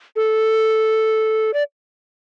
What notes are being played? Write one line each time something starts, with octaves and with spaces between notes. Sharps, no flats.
A4
D5